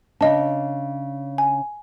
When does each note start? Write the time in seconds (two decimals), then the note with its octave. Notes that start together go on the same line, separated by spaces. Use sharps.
0.21 C#3 D4 D#5 A5
1.38 G#5